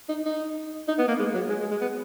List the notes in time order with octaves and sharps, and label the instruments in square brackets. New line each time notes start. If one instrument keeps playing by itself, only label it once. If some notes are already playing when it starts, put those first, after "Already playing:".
[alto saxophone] D#4
D#4
D#4
B3
A#3
G#3
F#3
G#3
G#3
G#3
B3